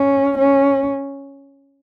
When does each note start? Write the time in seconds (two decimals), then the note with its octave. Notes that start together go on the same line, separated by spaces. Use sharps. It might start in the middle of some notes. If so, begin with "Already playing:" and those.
Already playing: C#4
0.39 C#4